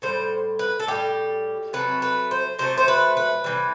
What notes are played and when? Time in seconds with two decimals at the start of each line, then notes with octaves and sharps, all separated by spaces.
0.02 A2 G3 C5
0.59 B4
0.80 A4
0.87 A2 G3 G4
1.73 C3 F#3 A3 B4
2.02 B4
2.31 C5
2.59 C3 F#3 A3 C5
2.78 C5
2.88 B4
3.17 B4
3.44 C3 E3 G3